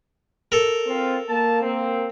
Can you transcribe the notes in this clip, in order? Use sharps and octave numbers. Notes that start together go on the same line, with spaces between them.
A4 A#4
C4 F4
A#3 A5
A#3 C4